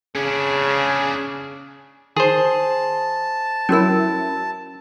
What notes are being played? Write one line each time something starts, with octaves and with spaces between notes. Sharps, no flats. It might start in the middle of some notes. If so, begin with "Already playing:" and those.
C#3 C#4 D4 G#4
D#3 G#4 C5 A5
F#3 C#4 E4 F#4 A#4